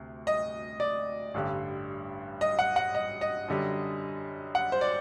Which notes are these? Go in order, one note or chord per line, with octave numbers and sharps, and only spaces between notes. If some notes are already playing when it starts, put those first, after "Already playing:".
Already playing: D2 C3
D#5
D5
A1 G2 D3 G3
D#5
F#5
F#5
D#5
D#5
F#2 D3 G3
F#5
C5
D5